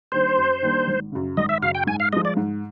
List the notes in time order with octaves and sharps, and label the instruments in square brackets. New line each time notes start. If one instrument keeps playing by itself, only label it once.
[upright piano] D#3 G3 A#3 D4 [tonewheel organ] C5
[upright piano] F#2
D#3 G3 A#3 D4
G#1
F#2 C#3
[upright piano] G#1 [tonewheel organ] D#5
[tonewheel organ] E5
[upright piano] F#2 C#3 [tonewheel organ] F5
[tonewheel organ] G5
[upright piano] G#2 [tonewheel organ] G#5
[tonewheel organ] F5
[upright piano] F3 G#3 [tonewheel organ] D#5
[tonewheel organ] D5
[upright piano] G#2